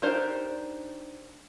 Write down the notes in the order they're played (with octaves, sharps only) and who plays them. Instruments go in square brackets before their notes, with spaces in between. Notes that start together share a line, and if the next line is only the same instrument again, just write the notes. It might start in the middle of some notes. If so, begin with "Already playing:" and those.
[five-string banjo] D4 D#4 G4 A#4 C5